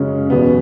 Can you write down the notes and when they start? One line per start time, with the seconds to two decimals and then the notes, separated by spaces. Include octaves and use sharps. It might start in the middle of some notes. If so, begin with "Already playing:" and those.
Already playing: F#2 C#3 G#3 C#4
0.30 E2 B2 F#3 B3